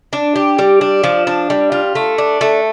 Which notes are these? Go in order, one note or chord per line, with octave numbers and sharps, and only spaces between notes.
D4
G4
G3
D4
F3
D4
G3
F4
A3
D4
A3